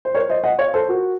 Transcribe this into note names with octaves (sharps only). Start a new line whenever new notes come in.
C5
A#4 C#5
C5 D#5
D#5 F#5
C#5 F5
A4 C5
F#4 A#4